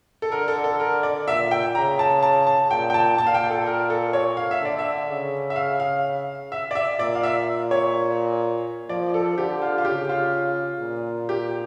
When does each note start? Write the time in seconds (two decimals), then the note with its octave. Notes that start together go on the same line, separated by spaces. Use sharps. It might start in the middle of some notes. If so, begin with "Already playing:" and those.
0.22 A4
0.32 D3 A#4
0.48 A4
0.64 A4
0.80 A#4
1.03 D5
1.28 A#2 E5
1.51 G5
1.75 C#3 A#5
1.99 A5
2.23 A5
2.47 A5
2.71 A#2 G5
2.90 G5
2.94 A5
3.18 A#2 A5
3.27 F5
3.34 G5
3.51 A4
3.66 A#4
3.90 A4
4.13 C#5
4.37 F5
4.51 E5
4.61 D3 D5
4.79 E5
5.09 C#3
5.50 E5
5.56 F5
5.80 F5
6.52 E5
6.71 D5
6.75 E5
6.99 A#2 D5
7.15 F5
7.23 E5
7.71 C#5
8.89 F3 D5
9.14 A4
9.37 D3 G4
9.62 F4
9.78 F4
9.85 C#3 G4
10.09 F4
10.80 A#2
11.29 G4